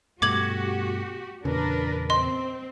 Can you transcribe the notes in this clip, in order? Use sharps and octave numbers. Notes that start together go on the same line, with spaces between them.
G2 B2 A3 F#4 G4 D6 G#6 F#7
E2 A#2 C#3 D4 A#4 B4
C4 D#5 C6